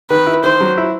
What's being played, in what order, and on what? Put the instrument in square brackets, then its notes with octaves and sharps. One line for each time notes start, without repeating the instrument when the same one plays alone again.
[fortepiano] D#3 [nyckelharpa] B4
[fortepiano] E4
[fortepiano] D#3 [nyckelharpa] C5
[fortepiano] F#3
E4